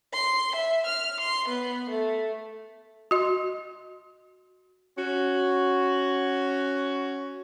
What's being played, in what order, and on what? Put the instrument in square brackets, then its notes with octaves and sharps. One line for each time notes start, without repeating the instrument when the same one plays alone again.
[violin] C6
E5
F6
C6
B3
A3
[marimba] F#4 D#5 C6
[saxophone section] C#4 F#4